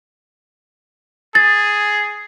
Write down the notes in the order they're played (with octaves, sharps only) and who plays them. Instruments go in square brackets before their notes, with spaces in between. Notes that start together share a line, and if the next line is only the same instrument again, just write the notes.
[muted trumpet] G#4 [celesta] A6